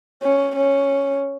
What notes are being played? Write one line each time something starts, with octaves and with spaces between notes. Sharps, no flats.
C#4
C#4